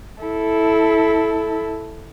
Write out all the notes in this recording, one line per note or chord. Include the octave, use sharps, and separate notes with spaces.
E4 A4